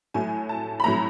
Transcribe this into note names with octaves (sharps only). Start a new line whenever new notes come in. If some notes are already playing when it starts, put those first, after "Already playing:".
A2 F#3 A3 G#5
A5
B5
A2 F#3 A3 A#5